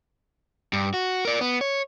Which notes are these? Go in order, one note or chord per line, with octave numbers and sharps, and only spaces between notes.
G2
F#4
A#4 D5
B3
C#5